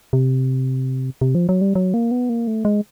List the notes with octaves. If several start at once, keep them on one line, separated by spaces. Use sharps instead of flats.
C3
C3
F3
F#3
G3
F#3
A#3
B3
A#3
A3
G#3